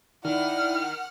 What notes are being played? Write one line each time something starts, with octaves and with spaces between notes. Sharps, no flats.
D#3 E4 D5 F#5 F6